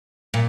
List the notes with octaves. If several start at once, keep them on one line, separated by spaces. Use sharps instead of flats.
A#2